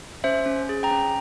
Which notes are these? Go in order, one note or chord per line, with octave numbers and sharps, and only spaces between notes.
C#4 C5 E5
C#4
G#4
G5 A#5
C#4